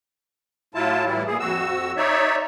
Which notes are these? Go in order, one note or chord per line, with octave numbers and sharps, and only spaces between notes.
A2 F#3 E4 F4 A5
A2 E3 G3 E4
A#2 G#4
F2 F#4 E6
D#4 C#5 D5 E5